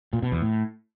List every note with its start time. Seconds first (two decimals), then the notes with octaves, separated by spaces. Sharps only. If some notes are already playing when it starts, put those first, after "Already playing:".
0.13 A#2
0.23 B2
0.32 E2
0.42 A2